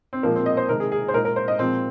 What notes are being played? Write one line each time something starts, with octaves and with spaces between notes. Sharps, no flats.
C4
A#2 F3 G#3 A#3
C4
D#5
C5
C3 D#3 G#3 A#4
G#4
G#4
C5
A#2 G#3 A#4
A#4
C5
D#5
A#2 F3 G#3 C4